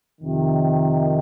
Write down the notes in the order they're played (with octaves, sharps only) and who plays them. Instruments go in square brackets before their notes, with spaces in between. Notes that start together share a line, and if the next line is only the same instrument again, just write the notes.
[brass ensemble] F2 C3 D#3